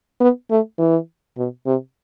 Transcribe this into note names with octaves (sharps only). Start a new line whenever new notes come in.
B3
A3
E3
B2
C3